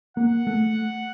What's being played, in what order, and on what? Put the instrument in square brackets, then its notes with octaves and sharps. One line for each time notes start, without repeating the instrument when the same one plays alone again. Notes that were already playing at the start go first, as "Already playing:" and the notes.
[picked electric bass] A#3 [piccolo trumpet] F#5
[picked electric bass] A3